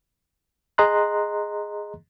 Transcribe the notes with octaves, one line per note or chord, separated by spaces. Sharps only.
G#4 D#5 A#5 C6 F#6